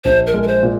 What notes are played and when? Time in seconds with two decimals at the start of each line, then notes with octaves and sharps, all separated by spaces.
0.04 A#1 C5
0.27 A#4
0.34 G#3
0.43 A#4
0.48 C5
0.63 A#2